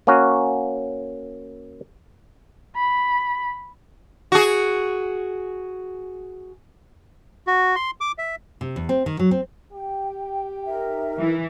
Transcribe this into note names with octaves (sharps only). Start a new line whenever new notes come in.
A#3 C#4 F#4
B5
F#4 G#4
F#4
C6
D6
E5
C3
E2
C4
D#3
F#3
C4
G4 G5
D#4 A#4 E5
E3